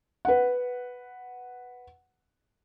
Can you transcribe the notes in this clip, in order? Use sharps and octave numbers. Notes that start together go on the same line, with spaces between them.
B4 F#5